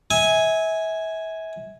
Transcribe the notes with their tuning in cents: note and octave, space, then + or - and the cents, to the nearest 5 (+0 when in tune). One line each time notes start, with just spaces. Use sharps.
E5 -30 G#5 +0